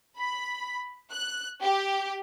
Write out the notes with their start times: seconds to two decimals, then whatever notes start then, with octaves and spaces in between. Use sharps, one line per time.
0.17 B5
1.12 F#6
1.62 G4